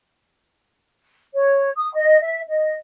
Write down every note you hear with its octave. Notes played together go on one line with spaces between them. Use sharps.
C#5
D#6
D#5
E5
D#5